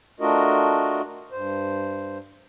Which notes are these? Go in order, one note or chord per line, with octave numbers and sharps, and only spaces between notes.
A3 D4 F4 F#4 A#4 D#5
G2 C5